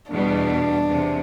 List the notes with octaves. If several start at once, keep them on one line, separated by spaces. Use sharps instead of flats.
E2 B2 G3 B3 D4
E2 C3